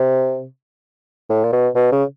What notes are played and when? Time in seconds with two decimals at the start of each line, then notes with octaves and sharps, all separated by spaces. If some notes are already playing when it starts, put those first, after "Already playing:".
Already playing: C3
1.30 A2
1.44 A#2
1.52 B2
1.75 B2
1.92 C#3